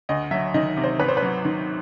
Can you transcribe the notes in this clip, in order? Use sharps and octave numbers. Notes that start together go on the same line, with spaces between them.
D2 D#5
F#3 E5
D#3 D#5
C3
C5
G#1 B4
C5
B4
F#3
D#3